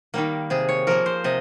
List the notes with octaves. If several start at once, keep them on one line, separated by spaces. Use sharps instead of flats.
D#3 G3 A#3
C3 G#4
C#5
F3 A#3 A#4
C5
C3 D#5